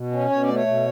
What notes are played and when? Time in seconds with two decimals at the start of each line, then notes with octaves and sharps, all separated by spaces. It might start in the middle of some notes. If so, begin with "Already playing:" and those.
Already playing: B2
0.12 C#4
0.29 B2 C#5
0.43 A3 D5
0.55 C#5
0.67 B2